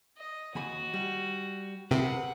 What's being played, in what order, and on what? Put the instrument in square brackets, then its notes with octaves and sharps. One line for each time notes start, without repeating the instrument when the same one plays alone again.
[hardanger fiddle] D#5
[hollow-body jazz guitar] D#2 G#5 B5 [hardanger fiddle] F#4
[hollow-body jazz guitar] G3
[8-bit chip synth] C3 [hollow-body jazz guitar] G#4 A#4 B4 [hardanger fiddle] F#5